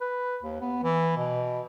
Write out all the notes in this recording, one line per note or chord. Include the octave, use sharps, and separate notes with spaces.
B4
D#2
B3
E3
B2